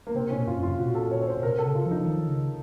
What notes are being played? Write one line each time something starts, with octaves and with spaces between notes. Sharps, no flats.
A#3
C3 C4
A#2 C#4
F#2 F4
F4
C3
A#2 F#4
A4
C#5
C#5
C5
A#2
C3 A#4
A4
C#3
F4
F3
D#4
D#3
C#3